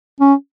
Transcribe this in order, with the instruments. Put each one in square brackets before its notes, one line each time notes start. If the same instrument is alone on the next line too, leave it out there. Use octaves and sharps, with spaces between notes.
[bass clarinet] C#4